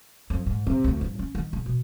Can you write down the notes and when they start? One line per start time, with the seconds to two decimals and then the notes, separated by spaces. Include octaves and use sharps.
0.30 F2
0.46 G#2
0.67 C3
0.84 D2
1.01 G2
1.19 C#4
1.35 D#3
1.53 C#3
1.66 B2